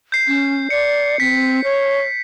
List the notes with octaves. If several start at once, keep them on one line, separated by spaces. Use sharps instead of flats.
G6 C7
C#4
D5 C#7
C4 B6
C#5